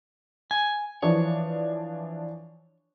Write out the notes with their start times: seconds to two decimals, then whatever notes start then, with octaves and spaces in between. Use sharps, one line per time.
0.51 G#5
1.02 E3 F3 D4 C#5